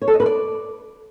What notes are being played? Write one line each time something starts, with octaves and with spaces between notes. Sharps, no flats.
C#5
A4
D#5
B4
D5